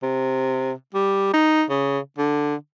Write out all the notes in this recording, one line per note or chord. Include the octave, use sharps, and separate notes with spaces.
C3
G3
D#4
C#3
D3